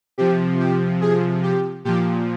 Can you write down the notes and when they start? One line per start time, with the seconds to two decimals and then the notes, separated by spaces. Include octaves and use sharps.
0.18 C3 F3 G4
0.59 G4
1.01 G#4
1.43 G4
1.85 A#2 F3 G4